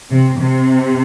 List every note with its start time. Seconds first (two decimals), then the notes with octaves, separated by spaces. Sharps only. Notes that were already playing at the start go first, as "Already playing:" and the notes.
0.10 C3
0.39 C3